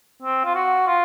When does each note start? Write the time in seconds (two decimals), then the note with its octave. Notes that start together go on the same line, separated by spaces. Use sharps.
0.23 C4
0.45 F4
0.55 F#4
0.87 F4